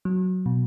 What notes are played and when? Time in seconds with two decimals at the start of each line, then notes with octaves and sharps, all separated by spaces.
0.05 F#3
0.46 B2